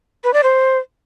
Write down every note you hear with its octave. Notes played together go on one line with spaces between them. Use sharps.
B4
D5
C5